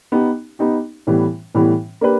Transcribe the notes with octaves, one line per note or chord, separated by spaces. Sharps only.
B3 D#4 G4
B3 D#4 G4
A2 E3 G3 B3
A2 E3 G3 B3
A#3 D4 G4 B4